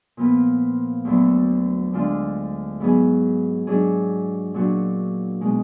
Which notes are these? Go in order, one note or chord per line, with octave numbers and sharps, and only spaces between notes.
A#2 F3 B3 F4
D2 D3 F#3 B3
D2 D3 G#3 D4 F4
G#2 F#3 B3 D#4 G#4
G#2 F#3 D4 G#4
A#2 F#3 D4 F#4
B2 G#3 D#4